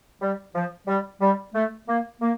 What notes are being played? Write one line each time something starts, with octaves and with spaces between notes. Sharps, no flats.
G3
F3
G3
G3
A3
A#3
A#3